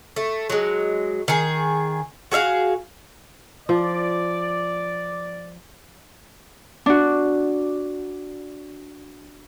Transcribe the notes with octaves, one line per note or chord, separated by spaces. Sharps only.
A3
F#3 G#3
D#3 G#4
F#4 G#4 E5 F5
F3 D5
D4 F#4